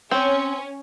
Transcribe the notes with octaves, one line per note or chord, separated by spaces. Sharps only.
C4 C#4